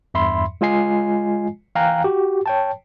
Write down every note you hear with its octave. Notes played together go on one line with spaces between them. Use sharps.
E2 G2 E5 B5 C6
G#3 F4 D#5 G#5 C7
E3 F5 G5 G#5 A#5 F#6
F#4 G4
C#5 G5 A5